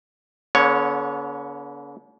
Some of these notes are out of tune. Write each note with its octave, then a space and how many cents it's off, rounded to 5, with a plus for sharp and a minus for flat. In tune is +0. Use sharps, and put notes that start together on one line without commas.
D3 -45 B3 -35 C#5 +0